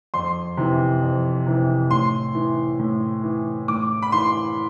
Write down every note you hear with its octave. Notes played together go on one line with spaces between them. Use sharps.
F2 C6
C3 E3
F2
C3 E3
A2 C6
E3
A2
E3
A2 D6
B5
E3 C6